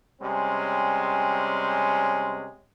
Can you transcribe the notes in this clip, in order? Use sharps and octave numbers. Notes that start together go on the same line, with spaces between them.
C3 G3 G#3 C#4